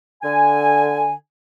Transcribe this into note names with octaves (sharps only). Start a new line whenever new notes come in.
D3 G#5